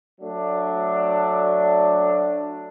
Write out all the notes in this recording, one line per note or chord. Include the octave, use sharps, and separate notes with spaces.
F#3 A3 D4